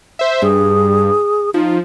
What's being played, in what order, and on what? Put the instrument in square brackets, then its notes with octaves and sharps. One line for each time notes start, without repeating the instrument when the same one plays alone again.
[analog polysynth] C5 E5
[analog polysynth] G2 [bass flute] G#4
[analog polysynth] F3 [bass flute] D#4